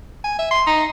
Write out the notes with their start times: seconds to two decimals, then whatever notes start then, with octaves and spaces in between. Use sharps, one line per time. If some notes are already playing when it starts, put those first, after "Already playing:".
0.24 G#5
0.38 E5
0.51 C6
0.66 D#4